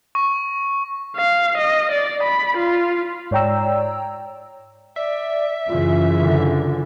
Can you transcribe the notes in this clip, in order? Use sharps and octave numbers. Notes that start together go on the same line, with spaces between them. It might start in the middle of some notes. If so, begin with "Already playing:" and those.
C#6
F5
D#5
D5
B5
F4
G#2 C#5 D5 G5 A#5 E6
D5 E5
F#2 C#3 E3 F4
D3